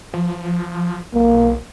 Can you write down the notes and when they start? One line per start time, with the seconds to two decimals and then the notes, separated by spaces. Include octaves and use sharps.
0.14 F3
1.14 B1 A#3